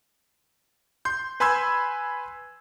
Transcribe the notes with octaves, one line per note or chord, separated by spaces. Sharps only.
C6 G6
B4 G#5 B5 C6 E6 G#6